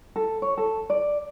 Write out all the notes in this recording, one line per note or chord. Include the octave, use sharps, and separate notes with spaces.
A4
C#5
A4
D5